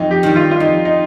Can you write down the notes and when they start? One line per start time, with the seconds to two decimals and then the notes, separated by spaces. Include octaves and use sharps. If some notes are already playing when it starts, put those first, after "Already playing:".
Already playing: F2 D#4
0.11 G4
0.23 D#3 G3
0.36 F4
0.51 F4
0.60 F2 D#4
0.85 D#4